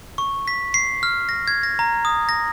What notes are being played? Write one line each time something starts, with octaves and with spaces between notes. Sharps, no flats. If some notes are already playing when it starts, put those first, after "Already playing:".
C#6
B6
C7
F6
A#6
G#6
A#6
A#5
D#6
A#6